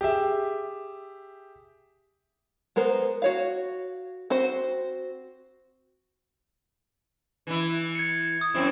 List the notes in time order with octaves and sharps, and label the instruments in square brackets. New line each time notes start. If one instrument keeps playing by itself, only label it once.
[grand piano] G4 G#4 E5
[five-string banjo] G#3 B3 A#4 C5
F#4 C#5 F5
C4 F#4 C5
[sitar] E3 E4
[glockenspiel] G#6 C#7
D#6
[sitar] F#2 C4 E4